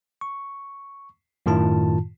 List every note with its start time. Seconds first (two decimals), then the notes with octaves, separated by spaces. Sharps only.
0.21 C#6
1.46 F#2 A2 D#3 F4 A5